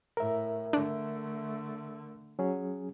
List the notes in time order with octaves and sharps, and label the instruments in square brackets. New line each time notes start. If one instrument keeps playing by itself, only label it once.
[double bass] A2 [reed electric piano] A#4 E5
[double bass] D3 A3 [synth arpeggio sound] D4
[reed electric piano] F#3 C#4 G#4